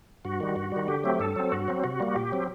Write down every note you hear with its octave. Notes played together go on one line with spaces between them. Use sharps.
G2 F#4
D#3 G3
G2
D#3 G3
D3 G4
F#3 A3 C4
G2 A4
F#3 C4
G2 F#4
F#3 C4
C3 F#4
G3 A#3
A#2 G4
F#3 C4